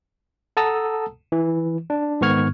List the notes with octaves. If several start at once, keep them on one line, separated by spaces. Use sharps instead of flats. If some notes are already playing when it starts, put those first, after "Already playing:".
A4 F#5 A5 A#5 D#6 E6
E3
D4
G#2 D#3 B3 C#6 F6 G#6